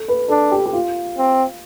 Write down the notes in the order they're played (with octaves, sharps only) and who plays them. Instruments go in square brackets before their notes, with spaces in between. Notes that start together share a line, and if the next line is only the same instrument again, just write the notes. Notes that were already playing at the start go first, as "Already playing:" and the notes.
Already playing: [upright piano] A4
B4
[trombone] D4 [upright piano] A4
[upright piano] G4
G4
F4
[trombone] C4